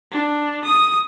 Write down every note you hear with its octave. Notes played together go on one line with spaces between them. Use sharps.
D4
D#6